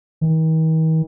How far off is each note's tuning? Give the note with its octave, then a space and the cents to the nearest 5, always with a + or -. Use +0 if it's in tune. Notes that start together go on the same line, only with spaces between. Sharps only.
D#3 +45